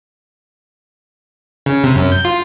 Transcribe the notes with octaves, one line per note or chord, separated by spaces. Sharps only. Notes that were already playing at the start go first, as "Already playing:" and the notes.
C#3
C3
F#2
G6
F4